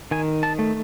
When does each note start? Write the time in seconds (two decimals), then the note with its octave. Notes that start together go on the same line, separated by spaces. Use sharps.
0.11 D#3 G#5
0.43 A5
0.59 A3